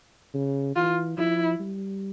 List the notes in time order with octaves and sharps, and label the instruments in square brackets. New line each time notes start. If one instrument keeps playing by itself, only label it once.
[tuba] C#3
[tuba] E3 [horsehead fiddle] F4
[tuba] F3 [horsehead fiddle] E4
[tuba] G3